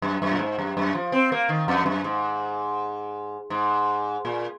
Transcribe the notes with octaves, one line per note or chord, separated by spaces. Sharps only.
F#2
F#2
A#2
G#2
F#2
F#2
F3
C4
A#3
D#3
F2
F#2
G#2
G#2
A#2